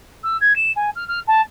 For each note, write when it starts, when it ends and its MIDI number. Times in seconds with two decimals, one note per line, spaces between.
0.23 0.37 88
0.40 0.55 92
0.55 0.71 100
0.76 0.90 80
0.95 1.06 89
1.08 1.19 89
1.27 1.41 81